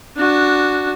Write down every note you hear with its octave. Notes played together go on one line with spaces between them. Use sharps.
D4 F#4